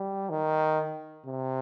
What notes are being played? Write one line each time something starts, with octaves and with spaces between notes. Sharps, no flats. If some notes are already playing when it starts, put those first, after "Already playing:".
Already playing: G3
D#3
C3